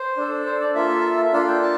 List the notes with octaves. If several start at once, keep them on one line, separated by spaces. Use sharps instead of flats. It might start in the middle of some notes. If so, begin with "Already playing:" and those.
Already playing: C5
D4 A4
C5
D5
A#3 F4 A4 E5
E5
A#3 D4 F4 A4 F5
G5
A5